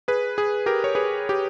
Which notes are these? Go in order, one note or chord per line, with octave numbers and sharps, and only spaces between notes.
G#4 B4
G#4
G4 A#4
C#5
G#4 B4
G4